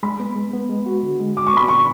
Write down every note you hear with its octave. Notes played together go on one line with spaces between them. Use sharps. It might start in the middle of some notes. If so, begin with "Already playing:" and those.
G#3 B5
B3
G#3
B3
G#3
F#4
D3
G#3
F#4 D6
C#6
B3 B5
D3 C#6